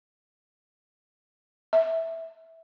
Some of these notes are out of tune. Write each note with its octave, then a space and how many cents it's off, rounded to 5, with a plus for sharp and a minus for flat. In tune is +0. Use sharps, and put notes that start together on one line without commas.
E5 -10